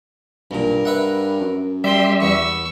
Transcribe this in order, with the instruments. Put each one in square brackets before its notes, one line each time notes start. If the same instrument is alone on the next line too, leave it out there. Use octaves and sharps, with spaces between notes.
[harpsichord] B1 A#2 [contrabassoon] G2 [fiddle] A#4
[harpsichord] B4 E5 F#5
[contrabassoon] F#2
[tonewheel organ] G3 E5 [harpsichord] D5 [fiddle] G5 C6
[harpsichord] E2 B3 [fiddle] C#6 E6